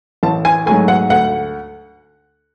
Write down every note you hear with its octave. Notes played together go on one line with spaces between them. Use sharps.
A1 A5
G#5
G#2 F#3 A3 G#5
F#5
D2 F#5